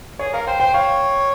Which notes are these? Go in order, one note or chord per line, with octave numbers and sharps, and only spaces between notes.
G#4 C#5
A#4 F5
C5 G5
C5 G5
C#5 F5